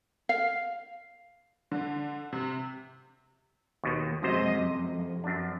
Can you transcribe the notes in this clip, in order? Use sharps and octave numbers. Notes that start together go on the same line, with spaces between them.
F5
D3
C3
D#2 B2 D#3
F#2 C3 F#3 G#3 C5 D#5
F2
F#2 D4